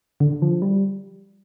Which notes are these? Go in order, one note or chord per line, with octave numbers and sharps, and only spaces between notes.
D3
F3
G3